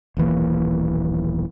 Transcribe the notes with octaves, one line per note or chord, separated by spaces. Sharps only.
D#1 B1 E3 A#3